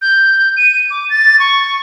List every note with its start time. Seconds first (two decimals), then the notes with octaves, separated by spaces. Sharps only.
0.02 G6
0.57 D#7
0.90 D6
1.10 A6
1.39 C#6